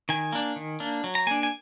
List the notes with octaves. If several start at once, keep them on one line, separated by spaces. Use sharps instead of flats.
D#3 G#5
A#3 D4
D#3
A#3 D4
F#3
A#5
A#3 D4 G#5
G#5